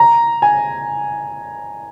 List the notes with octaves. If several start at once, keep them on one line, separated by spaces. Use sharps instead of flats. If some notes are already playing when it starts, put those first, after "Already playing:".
Already playing: A#5
G#5